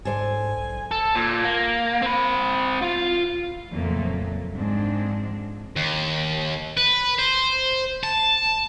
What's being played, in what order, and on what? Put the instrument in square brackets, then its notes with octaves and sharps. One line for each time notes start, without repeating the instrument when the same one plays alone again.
[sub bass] G#2 [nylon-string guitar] A4 C5 D5 [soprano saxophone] G#5
[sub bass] B1
[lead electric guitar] A4
A#2
A#3
C4 B5
F4
[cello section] F2 A#2 C#3 F#3 A3 A#3
G#2 F3 G#3 C4 D4
[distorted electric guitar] D#2
B4
C5
A5